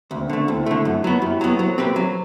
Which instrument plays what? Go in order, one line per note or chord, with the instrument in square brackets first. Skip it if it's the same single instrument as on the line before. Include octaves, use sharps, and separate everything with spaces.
[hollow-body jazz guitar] D2 [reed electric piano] A3 C4
[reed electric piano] C4
[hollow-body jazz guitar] D3 A3 [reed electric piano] B3 D4
[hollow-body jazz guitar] D2 [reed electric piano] C4 E4
[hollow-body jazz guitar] D3 A3
F#2
F#3 B3
[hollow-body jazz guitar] F#2 [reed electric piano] E4 G4
[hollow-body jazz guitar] F#3 B3
[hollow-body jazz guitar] F#3 [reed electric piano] A4 C5
[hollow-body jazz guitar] C4 G4 B4
F#3